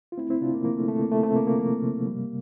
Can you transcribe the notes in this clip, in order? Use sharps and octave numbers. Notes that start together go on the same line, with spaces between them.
F4
A3 C4 E4
C4 E4
C3 D4 F4
A#3
F3 A#3
A3
C3 A3
A#3
A3
A3 C4
C3 A#3
A#3
F3 A#3
C3
G3